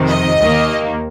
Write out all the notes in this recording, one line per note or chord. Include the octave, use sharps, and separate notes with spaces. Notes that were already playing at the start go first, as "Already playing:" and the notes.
Already playing: F2 C3 D#3
D#5
D#2 D#3 A#3